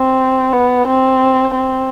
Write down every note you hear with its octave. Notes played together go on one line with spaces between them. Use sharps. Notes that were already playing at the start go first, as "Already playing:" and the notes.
Already playing: C4
B3
C4
C4